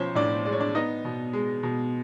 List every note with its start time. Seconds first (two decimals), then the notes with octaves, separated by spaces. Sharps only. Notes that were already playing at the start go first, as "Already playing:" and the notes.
Already playing: B1 F3 C#4 C5 C#5
0.15 A2 D4 D5
0.45 G#3 D5
0.52 C#5
0.60 D4 D5
0.75 B3 D#4 D#5
1.05 B2
1.33 G#3
1.63 B2